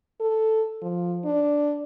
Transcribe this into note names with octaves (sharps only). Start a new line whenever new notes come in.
A4
F3
D4